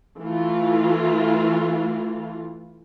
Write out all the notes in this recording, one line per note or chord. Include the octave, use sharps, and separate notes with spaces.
E3 A3 F4